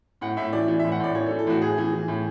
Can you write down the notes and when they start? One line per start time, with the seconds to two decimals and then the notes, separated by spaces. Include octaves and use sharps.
0.21 A2 F#5
0.37 A2 E5
0.53 E3 D5
0.68 E3
0.79 E5
0.84 A2
0.92 F#5
1.00 A2 D5
1.14 E3 C#5
1.26 A4
1.31 E3
1.39 A4
1.47 A2 F#4
1.62 A2 G#4
1.78 E3
1.93 E3
2.08 A2